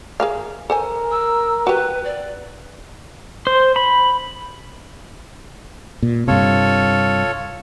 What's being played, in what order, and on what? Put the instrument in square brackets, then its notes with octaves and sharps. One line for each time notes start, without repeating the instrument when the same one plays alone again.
[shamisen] G#4 A#4 F5
[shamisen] A4 C5 G#5 [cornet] A#4
[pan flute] E6
[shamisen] F#4 G4 [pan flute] B4
[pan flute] D5
[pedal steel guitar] C5
B5
[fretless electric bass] A#2
[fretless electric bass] G2 C3 [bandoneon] F4 A4 C#5